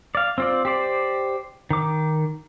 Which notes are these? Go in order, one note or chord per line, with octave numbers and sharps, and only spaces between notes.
D5 F5
C4 F4 D5
G4 C5 D5
D#3 D6